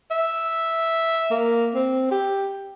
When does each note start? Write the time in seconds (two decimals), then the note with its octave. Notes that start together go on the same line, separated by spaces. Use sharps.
0.11 E5
1.31 A#3
1.74 C4
2.11 G4